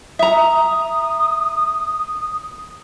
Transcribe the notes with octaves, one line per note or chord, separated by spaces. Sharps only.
E5 A#5 D#6